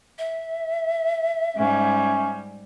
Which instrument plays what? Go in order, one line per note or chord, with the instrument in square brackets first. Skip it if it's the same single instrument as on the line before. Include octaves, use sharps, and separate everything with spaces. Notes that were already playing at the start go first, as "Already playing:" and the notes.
[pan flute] E5
[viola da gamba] G#2 G3 [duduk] C#4